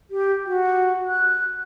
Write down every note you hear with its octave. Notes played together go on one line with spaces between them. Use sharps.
G4
F#4
F#6